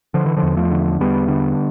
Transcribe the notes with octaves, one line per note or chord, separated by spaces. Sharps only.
D3 F3
E3
D3 F3
E2
F3 A3
D3
E2 G3 B3
D3